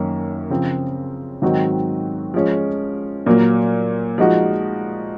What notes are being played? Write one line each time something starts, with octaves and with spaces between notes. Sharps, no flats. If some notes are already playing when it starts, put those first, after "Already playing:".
Already playing: F#2 D#3 A#3 C#4
C#3 F3 C4
G#2 D#3 F#3 C4 F#4
F3 G#3 C#4
A#2 F#3 A#3
F3 G#3 D#4 F#4